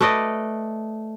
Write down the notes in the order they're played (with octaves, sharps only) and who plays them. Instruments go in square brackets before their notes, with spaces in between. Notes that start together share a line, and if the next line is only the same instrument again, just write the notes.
[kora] A3 B4 D5 D#5